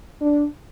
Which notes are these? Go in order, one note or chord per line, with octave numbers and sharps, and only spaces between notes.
D4